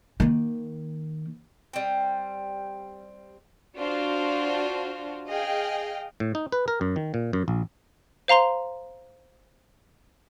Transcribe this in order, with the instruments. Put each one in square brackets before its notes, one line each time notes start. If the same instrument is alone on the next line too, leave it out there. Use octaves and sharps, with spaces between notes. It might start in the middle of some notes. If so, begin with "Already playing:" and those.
[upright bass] D#3 A#3
[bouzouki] G3 C4
[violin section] D4 F4 F#4 C5
G#4 D#5 F5 G5
[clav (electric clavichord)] A2
D#4
B4
A#4
F#2
D#3
A#2
F#2
A#1
[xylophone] C5 F5 A#5 C6 F7